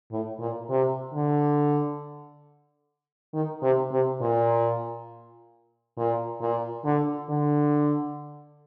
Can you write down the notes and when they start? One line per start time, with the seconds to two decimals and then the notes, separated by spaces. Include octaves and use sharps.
0.11 A2
0.40 A#2
0.69 C3
1.13 D3
3.33 D#3
3.62 C3
3.91 C3
4.21 A#2
5.97 A#2
6.41 A#2
6.84 D3
7.29 D3